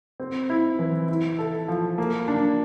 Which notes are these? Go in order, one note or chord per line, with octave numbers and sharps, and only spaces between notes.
C4
E4
E3
E4
A4
F3
A#3
D4